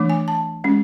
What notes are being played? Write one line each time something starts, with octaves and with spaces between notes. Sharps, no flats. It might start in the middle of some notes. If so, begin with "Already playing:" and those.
Already playing: E3 A3 D4
G#5
A5
G#3 C#4